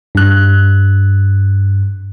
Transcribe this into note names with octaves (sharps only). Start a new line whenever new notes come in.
G2 F#6